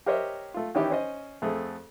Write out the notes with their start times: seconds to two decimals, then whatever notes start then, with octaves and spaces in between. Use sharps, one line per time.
0.06 G4 A#4 C5 C#5 D#5 E5
0.54 A3 F4
0.75 D#3 E3 C#4 D#4 E4 G4
0.91 C#4 C5 D#5
1.42 F2 A3 C4 G#4